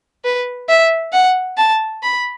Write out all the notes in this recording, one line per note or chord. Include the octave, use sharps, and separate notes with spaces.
B4
E5
F#5
A5
B5